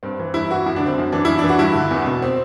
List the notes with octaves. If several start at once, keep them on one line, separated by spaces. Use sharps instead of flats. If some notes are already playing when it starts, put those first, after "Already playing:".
G2 C4
E3
G2 E4
E3 F#4
F#2 E4
D3 D4
C4
F#2
E3 D4
F#2 E4
E3 D4
F#4
G2 E4
D3
E2
B2
C4